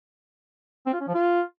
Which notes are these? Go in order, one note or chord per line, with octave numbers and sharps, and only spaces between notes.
C4
F4
C#4
F3
F4